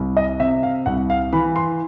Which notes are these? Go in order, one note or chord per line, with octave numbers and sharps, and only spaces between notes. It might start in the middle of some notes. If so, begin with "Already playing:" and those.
Already playing: C2
D#5
C3 E5
F5
C2 F#5
F5
E3 B5
C6